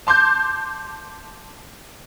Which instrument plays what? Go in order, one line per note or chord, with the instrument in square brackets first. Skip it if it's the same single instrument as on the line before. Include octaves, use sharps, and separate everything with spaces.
[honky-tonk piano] A5 C6 D6 G6